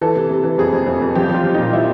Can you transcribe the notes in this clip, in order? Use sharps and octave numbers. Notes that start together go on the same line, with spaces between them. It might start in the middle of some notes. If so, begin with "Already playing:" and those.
E3 A4
C3
C3
E3
F2 G#4
F2
F2
F2
F3 G4
F3
F4
F3
A#2 D#4
F3 E4